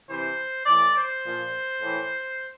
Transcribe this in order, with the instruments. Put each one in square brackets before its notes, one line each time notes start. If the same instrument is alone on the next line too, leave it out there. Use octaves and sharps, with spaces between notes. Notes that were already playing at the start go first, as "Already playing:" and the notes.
[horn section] C3 E3 C5
A2 E3 D5
C5
A#2 F3
A2 E3